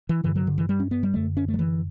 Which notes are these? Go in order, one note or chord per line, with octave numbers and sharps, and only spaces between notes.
E3
G2 D3 E3
F#3
D3
E3
G3
C#4
B3
G3
F#2 D3 A3
C#4
A3
F#3
E3